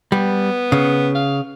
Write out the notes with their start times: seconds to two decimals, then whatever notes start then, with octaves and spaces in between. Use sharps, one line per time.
0.12 G3 B3
0.72 C#3
1.15 F5